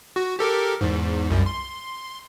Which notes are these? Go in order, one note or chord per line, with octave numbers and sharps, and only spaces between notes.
F#4
G4 A4 A#4
E2 G#2
C2 F#2
C6